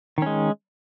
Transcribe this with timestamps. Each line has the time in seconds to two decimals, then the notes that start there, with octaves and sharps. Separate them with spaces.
0.18 D#3
0.22 C#4
0.26 G#3